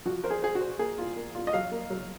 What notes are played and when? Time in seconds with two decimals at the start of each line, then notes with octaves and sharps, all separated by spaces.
0.05 F3 F#4
0.24 A#4 C5
0.30 G#4
0.42 G#4 C5
0.55 F#4
0.61 C5
0.79 A#3 G#4
0.98 F4
1.16 A#3
1.35 F4
1.47 D#5
1.53 F#3 F5
1.71 A#3
1.90 F#3